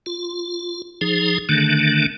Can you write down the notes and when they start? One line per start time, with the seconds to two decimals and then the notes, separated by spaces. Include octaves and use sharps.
0.06 F4
1.01 F3 D#4 G#4
1.49 D3 D#3 A3 D4